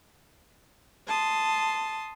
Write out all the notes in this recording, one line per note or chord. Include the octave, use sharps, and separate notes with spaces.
A5 C6 D#6